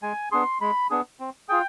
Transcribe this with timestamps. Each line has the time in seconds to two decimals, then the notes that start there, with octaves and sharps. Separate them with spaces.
0.02 G#3 G#5
0.32 B3 D4 G#4 C6
0.61 G#3 B5
0.90 B3 D4 G#4
1.20 C4
1.49 F4 G#4 G5